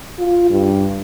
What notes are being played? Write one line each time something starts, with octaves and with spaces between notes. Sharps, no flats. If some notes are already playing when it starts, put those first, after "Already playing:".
F4
G2